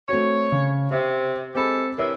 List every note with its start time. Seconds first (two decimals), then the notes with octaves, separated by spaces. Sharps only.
0.09 A3 C4 F#4 C#5
0.52 C#3
0.91 C3 E5
1.55 G#3 C4 G4 A4 B5
1.98 C3 E3 E4 A#4 C#5